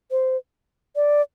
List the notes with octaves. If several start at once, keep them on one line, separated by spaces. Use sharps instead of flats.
C5
D5